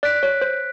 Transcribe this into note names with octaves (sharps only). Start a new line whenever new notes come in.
D5 F#6 B6 D7
C#5
C5